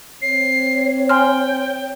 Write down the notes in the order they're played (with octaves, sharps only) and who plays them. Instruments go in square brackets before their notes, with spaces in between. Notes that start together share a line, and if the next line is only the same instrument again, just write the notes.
[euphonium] C4 [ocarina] C#5 [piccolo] C7
[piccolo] G5 [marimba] G#5 C6 F6